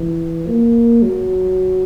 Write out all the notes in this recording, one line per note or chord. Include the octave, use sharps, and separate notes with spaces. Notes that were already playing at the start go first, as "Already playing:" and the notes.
Already playing: E3
A#3
F#3